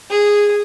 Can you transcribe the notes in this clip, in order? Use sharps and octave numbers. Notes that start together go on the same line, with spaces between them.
G#4